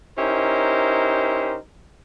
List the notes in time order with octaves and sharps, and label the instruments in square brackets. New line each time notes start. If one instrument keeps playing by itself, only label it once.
[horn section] C#4 D#4 E4 G4 A#4 C5